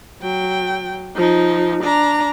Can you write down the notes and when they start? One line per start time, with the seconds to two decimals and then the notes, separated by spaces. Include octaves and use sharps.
0.21 F#3 G5
1.15 F3 D#4
1.83 D4 A#5